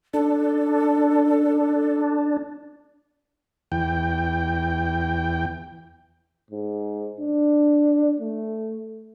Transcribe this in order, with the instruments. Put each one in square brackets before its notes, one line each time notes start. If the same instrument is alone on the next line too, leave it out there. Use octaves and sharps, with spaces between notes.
[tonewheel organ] D4 [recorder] A4
[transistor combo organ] E2 G5
[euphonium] G#2
D4
A3